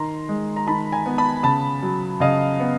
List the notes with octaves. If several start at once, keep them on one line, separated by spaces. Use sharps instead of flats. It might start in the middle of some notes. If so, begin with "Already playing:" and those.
Already playing: D#3 A#5 C6
G#3
A#5
D#3 A5 B5
G#5 A#5
B3
A5 B5
C#3 A5 B5
F#3
C#3 D#5 F5
B3